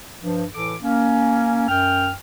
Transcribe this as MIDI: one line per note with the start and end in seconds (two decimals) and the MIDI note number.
0.21 0.45 43
0.21 0.45 53
0.54 0.76 45
0.54 0.76 52
0.54 0.76 69
0.54 0.76 86
0.82 1.66 58
0.82 1.66 61
1.69 2.12 42
1.69 2.12 79
1.69 2.12 89